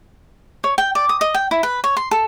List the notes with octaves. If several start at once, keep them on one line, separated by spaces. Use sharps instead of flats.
C#5
G5
D5
D#6
D#5
G5
E4
B4
C#5
C6
A4